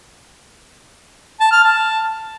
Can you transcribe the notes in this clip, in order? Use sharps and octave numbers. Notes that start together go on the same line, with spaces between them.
A5
F6
A5